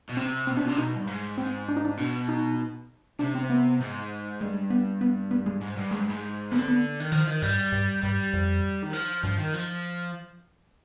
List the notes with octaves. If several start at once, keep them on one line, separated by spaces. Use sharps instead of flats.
B2
C3 C4
B2 C4
C3 D4
B2
C3 D4
B2 D#4
G2
G#2
G#2 C4
D4
D#4
D4
B2
D#4
C3 D4
C4
B3
G#2
G2 G#3
B3
B3
B3
G#3
G#2
G2
G#2 G#3
G2
G#2
D3 B3
C4
B3
D#3
D#3 F3
D#3
G2 G3
G2
G2 G3
F2
D#3
F3
G2 F3
D#3
F3